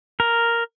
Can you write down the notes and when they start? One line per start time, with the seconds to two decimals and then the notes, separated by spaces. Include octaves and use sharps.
0.20 A#4